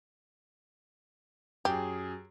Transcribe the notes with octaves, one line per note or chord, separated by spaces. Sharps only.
F#2 G4 G#4